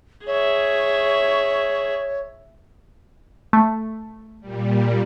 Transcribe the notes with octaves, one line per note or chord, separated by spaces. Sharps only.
G#4 C#5 E5
A3
A#2 G3